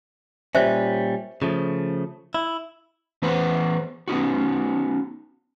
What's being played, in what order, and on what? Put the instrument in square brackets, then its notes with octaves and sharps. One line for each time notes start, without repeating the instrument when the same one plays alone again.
[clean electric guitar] A#2 G3 C#4 [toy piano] C5 E5
[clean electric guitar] C#3 F3 A3
E4
[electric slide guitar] E3 B3 B4 C5 F#5
B3 C#4 D#4 F#4